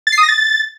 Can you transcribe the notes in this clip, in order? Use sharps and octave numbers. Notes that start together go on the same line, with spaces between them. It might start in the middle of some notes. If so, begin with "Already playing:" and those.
A6
C7
D#6
A#6
A6